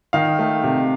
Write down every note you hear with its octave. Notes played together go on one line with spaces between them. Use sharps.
D#3 F5
A3
C3